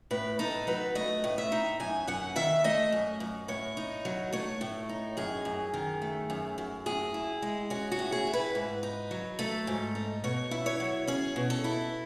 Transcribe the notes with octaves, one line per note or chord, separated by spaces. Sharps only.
A2 B4
D#4 A4
F#3 B4
A3 D#5
A2
E5
D#4
F#2 G#5
F#2 F#5
D#3 E5
A3 D#5
F#2
F#2
A2 C#5
D#4
F#3
A3 C#5
A2
D#4
F#2 G#4
F#2
D#3
A3
F#2
F#2
A2 G#4
E4
G#3
C#4 F#4
F#4
A2
G#4
E4
B4
G#2
D#4
F#3
A3 A4
G#2
D#4
B2 C#5
E4
C#5
F#3
C#4 G#4
B2
A4
E4